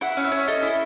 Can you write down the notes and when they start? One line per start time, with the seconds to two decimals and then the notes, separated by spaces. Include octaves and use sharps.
0.01 E4 F#5
0.17 C#4
0.24 E5
0.32 C#4
0.48 A4 D#5
0.63 E4